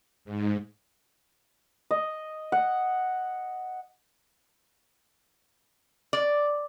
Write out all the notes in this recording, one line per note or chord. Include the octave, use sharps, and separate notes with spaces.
G#2
D#5
F#5
D5